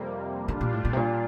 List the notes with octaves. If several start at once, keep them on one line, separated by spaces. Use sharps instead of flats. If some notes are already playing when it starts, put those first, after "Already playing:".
Already playing: F2 C3 G3 A#3
D3 G3 D4 F4
A#2
A2
A#2
C3
A#2